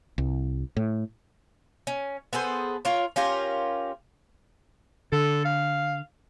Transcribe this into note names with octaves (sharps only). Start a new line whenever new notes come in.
C2
A2
C#4
B3 G#4 A4 C5
F4 A#4 C#5
C#4 F4 G4 A#4
D3 A4
F5